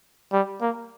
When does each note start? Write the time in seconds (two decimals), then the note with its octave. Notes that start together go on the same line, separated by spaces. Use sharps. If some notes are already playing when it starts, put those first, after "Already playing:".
0.33 G3
0.61 A#3